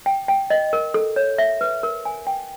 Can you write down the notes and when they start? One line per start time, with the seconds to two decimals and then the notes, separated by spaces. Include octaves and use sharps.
0.06 G5
0.28 G5
0.50 D#5
0.73 A#4
0.94 A4
1.16 C#5
1.38 E5
1.61 B4
1.83 A#4
2.05 G#5
2.27 G5